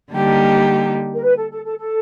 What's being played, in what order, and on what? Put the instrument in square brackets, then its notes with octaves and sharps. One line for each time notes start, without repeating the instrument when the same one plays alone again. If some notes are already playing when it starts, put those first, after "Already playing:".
[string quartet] D3 G3 A#3 D#4 G4
[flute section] A#4
B4
A4
A4
A4
A4